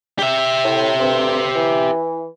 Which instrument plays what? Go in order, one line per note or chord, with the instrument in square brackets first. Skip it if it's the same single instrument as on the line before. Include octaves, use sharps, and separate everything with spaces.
[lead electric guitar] G4 E5
[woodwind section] A2
D2 G2 C4
E3